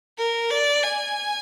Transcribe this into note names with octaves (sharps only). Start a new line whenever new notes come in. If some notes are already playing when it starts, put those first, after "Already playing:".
A#4
D5
G#5